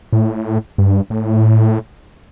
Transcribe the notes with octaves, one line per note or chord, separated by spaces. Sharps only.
A2
G2
A2